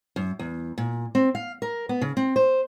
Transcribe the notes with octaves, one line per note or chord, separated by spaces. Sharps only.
F#2
E2
A#2
C4
F5
A#4
B3
C#3
C4
C5